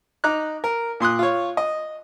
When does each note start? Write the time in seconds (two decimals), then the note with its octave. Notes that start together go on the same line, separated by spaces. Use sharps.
0.24 D#4 A#5 D6 F#6
0.64 A#4
1.00 A#2 C6 D#6 F#6
1.19 F4 C#5
1.57 D#5